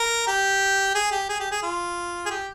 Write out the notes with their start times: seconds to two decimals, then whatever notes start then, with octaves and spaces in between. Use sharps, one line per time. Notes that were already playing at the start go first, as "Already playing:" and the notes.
Already playing: A#4
0.27 G4
0.95 G#4
1.11 G4
1.29 G#4
1.40 G4
1.51 G#4
1.63 F4
2.26 G#4
2.31 G4